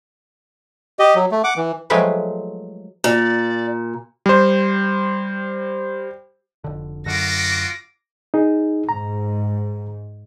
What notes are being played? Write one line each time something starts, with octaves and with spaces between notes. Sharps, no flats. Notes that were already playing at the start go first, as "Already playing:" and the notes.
G4 D#5
F#3
A3
F#5 D6
E3
F3 F#3 G#3 A3 G4 B4
A#2 D5
G3 C5
F1 D3
F#2 D3 F4 F#4 D6 A#6
D#4 G#4
G#2 A#5